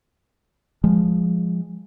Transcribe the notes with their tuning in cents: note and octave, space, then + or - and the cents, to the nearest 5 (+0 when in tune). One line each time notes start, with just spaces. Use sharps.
F3 +0 G#3 -15